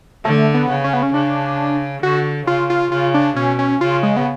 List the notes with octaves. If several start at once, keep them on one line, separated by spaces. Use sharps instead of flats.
D3 A3
B3
C#3
C#4
B3
C#4
C#3 D4
D3 F#4
C#3 F4
F4
C#3 F4
D4
B2 C#4
C#4
C#3 F4
G#3
B3